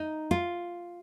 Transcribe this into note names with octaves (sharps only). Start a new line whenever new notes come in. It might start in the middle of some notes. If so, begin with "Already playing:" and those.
Already playing: D#4
F4